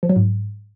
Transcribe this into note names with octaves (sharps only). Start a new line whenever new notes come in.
F3
F#3
G#2